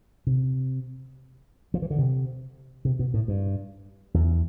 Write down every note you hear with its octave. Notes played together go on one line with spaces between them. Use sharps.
C3
F3
E3
D3
C3
C3
B2
A2
G2
E2